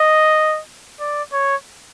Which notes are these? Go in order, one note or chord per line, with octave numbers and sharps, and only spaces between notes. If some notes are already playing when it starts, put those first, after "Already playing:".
Already playing: D#5
D5
C#5